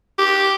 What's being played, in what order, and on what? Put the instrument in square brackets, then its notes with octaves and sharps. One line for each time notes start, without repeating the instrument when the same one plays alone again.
[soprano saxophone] G4